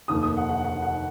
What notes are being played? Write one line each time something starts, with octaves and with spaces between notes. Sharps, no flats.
F1 D#2 D#3 A#3 D#6
D#6
F#5
F#5
F#5
F#5